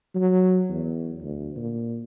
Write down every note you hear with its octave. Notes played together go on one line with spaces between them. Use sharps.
F#3
E2
D2
A#2